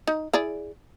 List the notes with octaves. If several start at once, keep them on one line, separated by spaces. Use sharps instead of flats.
D#4
E4 G#4 D5